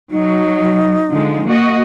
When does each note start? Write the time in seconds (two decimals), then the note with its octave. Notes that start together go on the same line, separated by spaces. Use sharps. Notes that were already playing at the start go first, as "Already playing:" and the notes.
0.11 F#3 D#4
1.10 D3 F3 G#3
1.47 A#3 F#4 D#5